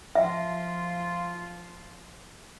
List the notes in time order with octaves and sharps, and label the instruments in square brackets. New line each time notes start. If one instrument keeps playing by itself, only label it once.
[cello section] F3 F4 [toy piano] E5